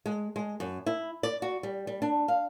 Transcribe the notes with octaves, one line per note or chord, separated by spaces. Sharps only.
G#3
G#3
F#2
E4
D5
F#4
G3
G3
D4
F5